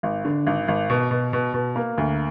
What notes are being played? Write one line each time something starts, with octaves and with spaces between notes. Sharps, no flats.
G#1
D3
G#1
G#1
B2
B2
B2
B2
A#3
D2